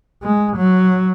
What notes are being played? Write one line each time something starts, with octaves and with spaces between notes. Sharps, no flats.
G#3
F#3